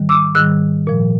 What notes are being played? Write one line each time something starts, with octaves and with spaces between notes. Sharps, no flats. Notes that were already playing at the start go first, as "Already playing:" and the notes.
Already playing: G#2 D#3 G3
D6 E6
G#2 D#3 G3 E6 F#6
A#2 F3